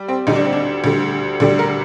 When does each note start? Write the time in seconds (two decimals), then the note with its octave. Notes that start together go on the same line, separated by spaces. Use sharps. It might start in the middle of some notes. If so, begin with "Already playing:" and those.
Already playing: G3
0.08 C4
0.27 D2 D3 G3 D#4
0.35 D4
0.44 C4
0.53 D4
0.84 D2 D3 G3
1.40 D2 D3 G3
1.59 A#4